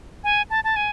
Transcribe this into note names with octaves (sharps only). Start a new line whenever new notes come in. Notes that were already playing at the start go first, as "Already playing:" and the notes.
G#5
A5
A5
G#5